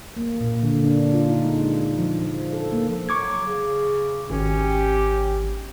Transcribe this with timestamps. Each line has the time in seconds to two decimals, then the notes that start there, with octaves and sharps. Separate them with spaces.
0.17 A#3
0.41 A#2
0.63 D3
0.84 D4
1.14 F4
1.29 D#4
1.45 G#3
1.98 F3
2.19 F3
2.53 A4
2.72 A#3
3.09 F#3 C#6 D6 G#6
3.46 C#3
4.30 G#1 C#4 G4